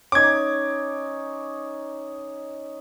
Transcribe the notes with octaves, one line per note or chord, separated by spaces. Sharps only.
C#4 D#4 D6 G#6